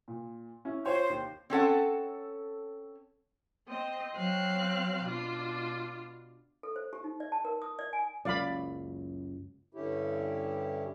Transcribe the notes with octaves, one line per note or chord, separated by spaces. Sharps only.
A#2
C#4 E4
F4 C5 C#5
D#2
C4 C#4 A4 F#5
C4 D#5 C6
F#3 C4 F5 F#6
B2 D4 F4
A4
C5
G4
D#4
D5
A5
A#4
D#6
D5
G#5
F#1 C#2 F#2 D5 F5 B5
G2 D3 C#4 E4 G4